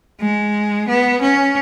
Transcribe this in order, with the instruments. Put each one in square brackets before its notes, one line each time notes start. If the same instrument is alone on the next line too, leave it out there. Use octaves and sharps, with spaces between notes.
[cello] G#3
B3
C#4